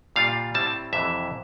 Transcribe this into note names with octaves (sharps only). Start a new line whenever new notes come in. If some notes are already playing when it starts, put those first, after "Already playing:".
A#2 G3 D4 F4 F5
A2 G3 C4 E4 A5
F2 C3 E3 E5